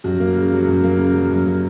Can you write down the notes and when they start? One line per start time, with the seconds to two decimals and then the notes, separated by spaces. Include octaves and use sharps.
0.04 F#2 F#4
0.20 A#3
0.36 C#3
0.52 F#3
0.67 F#2
0.84 A#3
0.98 C#3
1.15 F#3
1.31 F#2
1.46 A#3